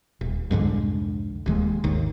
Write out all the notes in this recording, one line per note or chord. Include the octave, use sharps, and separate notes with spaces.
D#1
C2 F2 G#2 D3
D#1 D#2 G#3
G#1 D#2 D#3